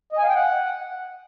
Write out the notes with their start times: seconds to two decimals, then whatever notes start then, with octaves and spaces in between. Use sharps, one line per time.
0.13 D#5
0.18 G#5
0.24 F5
0.29 G5
0.34 F#5